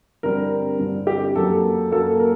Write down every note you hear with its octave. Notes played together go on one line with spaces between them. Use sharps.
G2 D3 G3 C4 A#4
G2 D3 G3 C4
G4
F#2 F#3 A#3 A4
F#2 F#3 A#3 A4
A#4